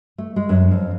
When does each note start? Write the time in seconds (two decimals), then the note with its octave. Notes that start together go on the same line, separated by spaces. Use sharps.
0.18 A3
0.36 G#3
0.49 F#2
0.71 F2